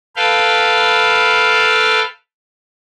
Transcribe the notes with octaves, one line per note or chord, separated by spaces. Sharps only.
A4 B4 F5 G5